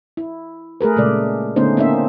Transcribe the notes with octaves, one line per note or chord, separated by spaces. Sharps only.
E4
A3 G#4 A#4 B4
A#2 C#3 G#3 A3 D5
D3 A3 B3 C#4 D#4 C5
A#3 C4 C#4 D#4 E5